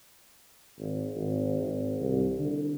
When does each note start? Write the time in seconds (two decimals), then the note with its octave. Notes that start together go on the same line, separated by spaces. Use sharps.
0.79 G#1
1.16 G#1
1.63 G#1
2.00 C2
2.38 D3